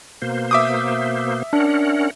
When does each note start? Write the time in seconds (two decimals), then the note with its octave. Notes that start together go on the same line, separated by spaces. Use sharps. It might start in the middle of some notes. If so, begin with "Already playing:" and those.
0.22 B2 A#3 C5
0.51 E5 D6 D#6
1.53 C#4 D4 A#4 F#5